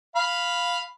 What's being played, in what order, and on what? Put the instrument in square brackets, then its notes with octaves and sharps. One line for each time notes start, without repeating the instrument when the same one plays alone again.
[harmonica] F5 B5